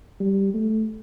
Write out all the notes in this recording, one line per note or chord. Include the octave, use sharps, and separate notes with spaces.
G3
A3